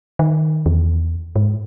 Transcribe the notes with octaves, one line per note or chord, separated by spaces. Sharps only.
D#3
E2
G#2